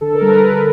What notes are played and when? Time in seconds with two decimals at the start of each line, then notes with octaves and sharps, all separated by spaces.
0.01 D3 A4
0.15 A#4
0.22 G3
0.28 B4
0.41 D3